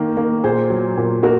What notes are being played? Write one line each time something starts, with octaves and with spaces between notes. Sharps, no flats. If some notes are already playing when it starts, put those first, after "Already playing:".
Already playing: D#3 A#3
A#3
A#2 G#4 C5
F#3
A#2
A#3 F#4 A#4